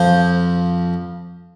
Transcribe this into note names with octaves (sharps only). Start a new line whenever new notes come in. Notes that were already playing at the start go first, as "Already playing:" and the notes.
Already playing: F2 F3 C5